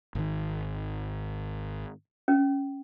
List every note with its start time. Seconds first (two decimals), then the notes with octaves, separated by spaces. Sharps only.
0.15 G#1 D#3
2.28 C#4